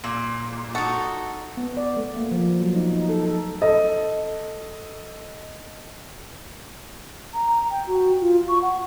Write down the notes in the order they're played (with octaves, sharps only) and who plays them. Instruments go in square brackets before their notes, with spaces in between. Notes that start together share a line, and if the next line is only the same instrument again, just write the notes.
[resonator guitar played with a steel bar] A#2
[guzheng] D#4 A4 [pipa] F#4
[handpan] B3
D5
A3
A#3
F3
F#3
D#4
D#4
A4
A4
[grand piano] A4 D#5
[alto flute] A#5
G5
F#4
F4
C#6
F#5